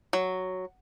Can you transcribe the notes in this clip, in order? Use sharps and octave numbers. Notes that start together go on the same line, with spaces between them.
F#3